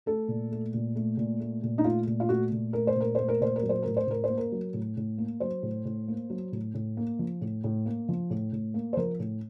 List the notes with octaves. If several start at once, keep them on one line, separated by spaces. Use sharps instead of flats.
A3 A4
A#2
A3
A#2
A3
A#2
A3
A#2
D#4
A3 F4
A#2
F4
A3 F#4
A#2
A3 A#4
C5
A#2 A#4
A3 C5
A#4
A#2 C5
A#4
F#3
C5
A2 A#4
C5
A2 A#4
C5
A#3
A#4
F#3
A2
A2
A#3
F#3 C5
A2
A2
A#3
F#3
A2
A2
A#3
F3
A2
A2
A#3
F3
A2
A2
A#3
C5
F3 A#4
A2